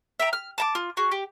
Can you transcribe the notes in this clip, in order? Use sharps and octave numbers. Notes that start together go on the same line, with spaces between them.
E5 G5 A#5
F6
A5 A#5 D6
F4
F#4 G#4
G4